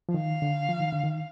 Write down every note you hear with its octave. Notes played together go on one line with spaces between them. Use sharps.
F3
D#3 F5
D3
F3
D#3
D3
D#3